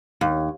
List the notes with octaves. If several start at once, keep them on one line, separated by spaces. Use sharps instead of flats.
D#2